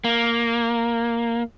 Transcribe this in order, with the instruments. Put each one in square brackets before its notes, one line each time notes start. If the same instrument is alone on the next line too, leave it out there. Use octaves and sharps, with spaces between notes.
[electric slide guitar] A#3